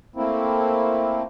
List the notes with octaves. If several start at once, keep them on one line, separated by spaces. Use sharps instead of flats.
A3 A#3 C4 E4